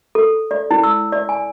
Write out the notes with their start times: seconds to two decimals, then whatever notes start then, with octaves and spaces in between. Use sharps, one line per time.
0.15 A4
0.51 D5
0.71 E4
0.84 E6
1.12 D5
1.29 G#5